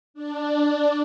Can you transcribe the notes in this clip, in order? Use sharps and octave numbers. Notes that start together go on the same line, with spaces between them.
D4